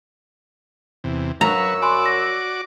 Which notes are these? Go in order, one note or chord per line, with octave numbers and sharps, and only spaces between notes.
E2 C3
F#2 F#3 B4 C#5 A#5 C#6 E6
F#4 D5 G#5 B5 C6 D6
A#6